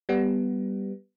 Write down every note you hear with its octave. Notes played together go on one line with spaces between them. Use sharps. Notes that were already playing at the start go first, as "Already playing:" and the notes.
G3 B3